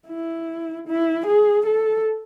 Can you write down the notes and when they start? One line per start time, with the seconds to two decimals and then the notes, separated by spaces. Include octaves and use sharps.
0.08 E4
0.88 E4
1.27 G#4
1.66 A4